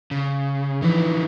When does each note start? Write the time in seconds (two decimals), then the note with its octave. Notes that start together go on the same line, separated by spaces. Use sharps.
0.11 C#3
0.82 D3 E3 F3 D#4 B4